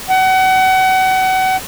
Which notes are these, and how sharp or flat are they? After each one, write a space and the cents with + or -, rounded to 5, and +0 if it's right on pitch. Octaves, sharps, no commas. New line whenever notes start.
F#5 +30